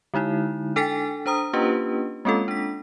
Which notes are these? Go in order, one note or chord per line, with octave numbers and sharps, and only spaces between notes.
D3 G#3 D#4 E4
D4 A4 G5 G#5 A6 B6
D4 C5 A#5 D#6
A#3 C#4 D4 F4 G4 B4
G#3 A#3 C4 C#4 F4 A4
D4 B6